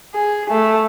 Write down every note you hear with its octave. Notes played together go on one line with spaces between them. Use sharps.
G#4
A3